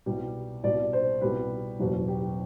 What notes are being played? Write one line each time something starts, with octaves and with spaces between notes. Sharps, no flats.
C2 B2 G3 G4
C2 B2 G3 D5
C5
C2 B2 G3 B4
F#1 E2 B2
G4